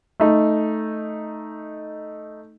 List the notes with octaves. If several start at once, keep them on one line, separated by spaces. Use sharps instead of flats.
A3 D#4